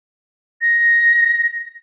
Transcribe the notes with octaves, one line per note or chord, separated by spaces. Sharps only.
A#6